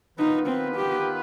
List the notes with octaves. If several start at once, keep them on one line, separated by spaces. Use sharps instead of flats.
D#3 B3 D#4 F4 B4
C4
G4